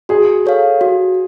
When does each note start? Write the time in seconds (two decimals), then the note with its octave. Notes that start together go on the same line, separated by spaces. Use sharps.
0.09 F#4 G#4
0.46 A4 C#5 F5
0.81 F#4